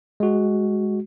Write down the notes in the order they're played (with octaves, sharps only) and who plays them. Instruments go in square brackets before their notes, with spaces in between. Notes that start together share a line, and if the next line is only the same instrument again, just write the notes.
[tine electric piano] G#3 F#4